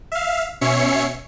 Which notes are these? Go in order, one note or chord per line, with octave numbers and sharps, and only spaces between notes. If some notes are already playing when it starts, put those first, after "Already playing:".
E5 F5
B2 C#4 C#5 E5 C7 C#7